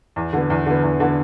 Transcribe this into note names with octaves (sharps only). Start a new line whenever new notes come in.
E2
D3 B3
E2
D3 B3
E2
D3 B3